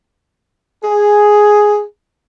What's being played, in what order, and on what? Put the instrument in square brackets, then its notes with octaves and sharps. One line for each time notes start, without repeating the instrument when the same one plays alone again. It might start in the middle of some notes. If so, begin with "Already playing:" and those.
[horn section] G#4